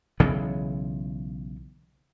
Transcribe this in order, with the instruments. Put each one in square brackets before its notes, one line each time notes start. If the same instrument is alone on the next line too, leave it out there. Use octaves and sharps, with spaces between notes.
[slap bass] B1 C#3 E3 B3